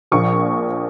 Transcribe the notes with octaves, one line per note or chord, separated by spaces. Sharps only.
A#1 A#2 F3 C#6